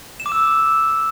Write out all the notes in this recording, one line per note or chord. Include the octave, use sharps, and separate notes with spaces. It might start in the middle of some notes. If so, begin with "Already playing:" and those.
E7
D6
E6